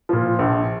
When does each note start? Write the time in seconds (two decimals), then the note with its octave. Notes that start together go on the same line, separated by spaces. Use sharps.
0.09 A#2 F3
0.39 A#1